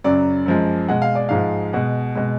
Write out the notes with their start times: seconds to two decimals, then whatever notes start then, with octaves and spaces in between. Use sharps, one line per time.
0.04 F#2 C#3 F#3 D5
0.46 F#2 F3 G#3
0.89 B2 G#3 F#5
1.02 F5
1.15 D5
1.29 G#2 F3 G#3 F5
1.73 B2 G#3 F#5
2.15 B2 G#3